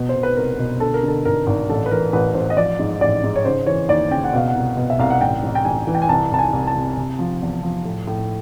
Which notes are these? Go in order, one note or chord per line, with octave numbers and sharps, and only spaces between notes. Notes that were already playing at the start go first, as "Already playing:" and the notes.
Already playing: B2
C5
B2
B4
C2 A#4
B2
D3 A4
A#4
D3 A4
G#1 A#4
G#1
A1 A4
B4
E3 A#4
A1 B4
A1 C5
D#5
F3 D5
G#2
A1 D5
G#2
C#5
C#3 C5
E3 C#5
D#2 D5
C#3 G5
F#5
B2 F5
F#5
C2
B2
E5
C2 F5
F#5
A1 G5
A1
G5
A1 G#5
E3
G5
G#5
C2 A5
C2 A5
G#5
C2
A5
C3
C3
F3
E2
F3
A2
A2